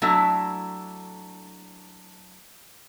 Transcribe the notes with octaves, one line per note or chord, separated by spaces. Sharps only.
F#3 A3 D4 E4